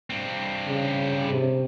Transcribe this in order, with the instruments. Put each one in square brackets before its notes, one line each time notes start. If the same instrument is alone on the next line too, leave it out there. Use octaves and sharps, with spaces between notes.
[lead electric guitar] G2 C4
[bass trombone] C#3
C3